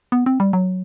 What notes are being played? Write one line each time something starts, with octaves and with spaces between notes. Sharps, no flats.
B3
C4
G3
F#3